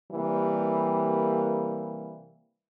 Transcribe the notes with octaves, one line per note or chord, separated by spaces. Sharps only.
C3 E3 G3 A#3